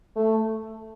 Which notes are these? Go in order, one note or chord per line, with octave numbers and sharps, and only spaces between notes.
A3